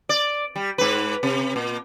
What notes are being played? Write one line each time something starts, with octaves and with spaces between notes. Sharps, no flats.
D5
G3
G#2 B4
C3
A#2